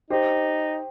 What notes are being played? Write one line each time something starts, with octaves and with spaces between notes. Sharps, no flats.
D#4 G4 C5